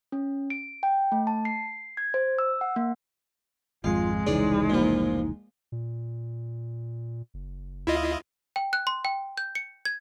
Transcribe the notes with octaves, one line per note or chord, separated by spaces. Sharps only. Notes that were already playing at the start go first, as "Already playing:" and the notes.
C#4
D7
G5
A3
A5
C7
G#6
C5
E6
F#5
A#3
G#1 F2 G#3 F4 F5
F1 C#2 E3 D#4 G#4 C#5 D5
A#2 F3
A#2
F#1
D2 E4 F4 D#5
G5
F#6
C6
G5
G6
C#7
G#6